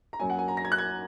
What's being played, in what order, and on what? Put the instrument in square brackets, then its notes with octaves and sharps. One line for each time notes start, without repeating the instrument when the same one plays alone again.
[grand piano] A#5
F#2 F#3 A#3 G#5
F#5
G#5
A#5
A#6
G#6
F#6
G#6